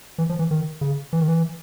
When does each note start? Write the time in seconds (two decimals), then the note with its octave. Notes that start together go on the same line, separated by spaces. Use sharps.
0.18 E3
0.29 F3
0.39 E3
0.51 D#3
0.81 C#3
1.13 E3
1.21 D#3
1.28 E3